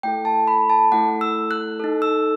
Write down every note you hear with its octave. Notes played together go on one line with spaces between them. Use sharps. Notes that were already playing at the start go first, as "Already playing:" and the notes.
A3 E4 A4 G5
A5
B5
A5
A3 E4 A4 F#5
E6
F#6
D#4 A4
E6